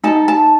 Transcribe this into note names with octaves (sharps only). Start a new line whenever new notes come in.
D#4 A4 A5
A5